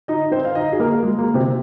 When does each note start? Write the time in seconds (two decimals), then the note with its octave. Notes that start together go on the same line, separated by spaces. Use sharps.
0.08 D#4 D#5
0.32 C4 C5
0.45 F5
0.55 D#4 D#5
0.73 G#4
0.79 A#3 A#4
1.03 G#3
1.19 A#3
1.34 C3 C4